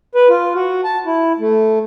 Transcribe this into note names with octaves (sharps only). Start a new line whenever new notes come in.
B4
F4
F#4
A5
E4
A3